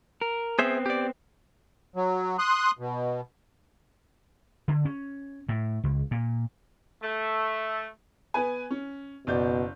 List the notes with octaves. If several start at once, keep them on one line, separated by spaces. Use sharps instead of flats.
A#4
B3 C4 G#4 C5 E5
G4 D5
F#3
C6 D#6 F#6
B2
D3
C#4
A2
C#2
A#2
A3
B3 B4 G#5
C#4
F#1 B2 D5 G6